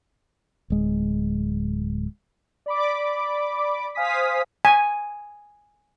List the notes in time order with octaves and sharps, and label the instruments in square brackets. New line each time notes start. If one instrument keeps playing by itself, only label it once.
[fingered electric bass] D1 G#3
[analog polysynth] D5 B5 D6
C5 F5 G#5 D#6 B6
[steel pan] G#5